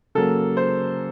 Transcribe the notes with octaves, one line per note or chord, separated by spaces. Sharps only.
C#3 F#3 A#3 A4
C5